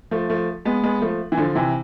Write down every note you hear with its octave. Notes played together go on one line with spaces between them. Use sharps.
F3 A3
F3 A3
G#3 B3
G#3 B3
F3 A3
E3
D3 F3
C3 E3